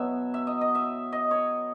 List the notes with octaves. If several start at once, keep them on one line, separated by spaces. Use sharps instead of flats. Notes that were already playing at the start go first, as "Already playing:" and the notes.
Already playing: B2 F#3 B3 E5
E5
D#5
D#5
E5
D#5
C#5